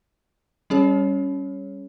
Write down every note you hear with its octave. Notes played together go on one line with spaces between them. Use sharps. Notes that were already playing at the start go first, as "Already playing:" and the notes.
G3 C#4 G#4 C#5